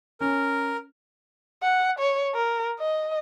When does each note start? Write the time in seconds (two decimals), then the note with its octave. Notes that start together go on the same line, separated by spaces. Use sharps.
0.21 C#4 A#4
1.62 F#5
1.99 C#5
2.35 A#4
2.79 D#5